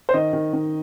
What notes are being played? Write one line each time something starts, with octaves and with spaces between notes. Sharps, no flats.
C5
D#3 D#5
D#3
D#3